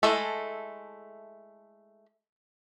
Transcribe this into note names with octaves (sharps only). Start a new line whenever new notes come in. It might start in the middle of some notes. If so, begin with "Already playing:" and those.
G#3 A3 E4 A4